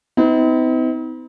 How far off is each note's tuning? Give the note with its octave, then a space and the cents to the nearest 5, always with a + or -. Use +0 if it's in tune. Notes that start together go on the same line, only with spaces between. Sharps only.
C4 -45 D#4 +45